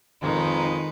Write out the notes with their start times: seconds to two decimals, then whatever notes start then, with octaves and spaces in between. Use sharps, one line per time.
0.22 F2 D#3 G#3 D#4 B4